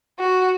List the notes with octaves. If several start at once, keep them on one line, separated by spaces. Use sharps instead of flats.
F#4